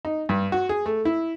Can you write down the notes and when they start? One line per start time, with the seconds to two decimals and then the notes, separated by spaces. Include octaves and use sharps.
0.05 D#4
0.29 G2
0.52 F#4
0.69 G#4
0.86 A3
1.05 E4